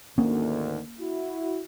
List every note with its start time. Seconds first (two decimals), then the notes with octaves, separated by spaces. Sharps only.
0.18 D2 G#2 D#3 A#3 C#4
0.99 E4 F#4